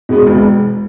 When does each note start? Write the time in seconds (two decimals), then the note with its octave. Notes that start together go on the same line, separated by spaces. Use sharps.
0.09 B2 G#3 B3
0.27 E1